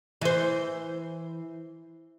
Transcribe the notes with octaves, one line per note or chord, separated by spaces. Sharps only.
E3 C5